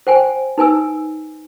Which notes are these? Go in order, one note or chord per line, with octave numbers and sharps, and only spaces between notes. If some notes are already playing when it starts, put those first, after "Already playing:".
C5 G5 G#5
D#4 B4 G#5 E6